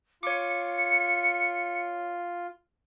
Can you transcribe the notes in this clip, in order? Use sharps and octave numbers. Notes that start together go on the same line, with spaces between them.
F4 C#5 D6 C#7